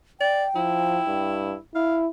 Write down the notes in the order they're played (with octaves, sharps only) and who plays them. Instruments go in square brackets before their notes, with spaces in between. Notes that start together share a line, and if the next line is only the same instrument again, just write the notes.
[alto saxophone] D5 [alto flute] G5
[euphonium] F3 [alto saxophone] E4
[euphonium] G2
[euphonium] E4 [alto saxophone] F5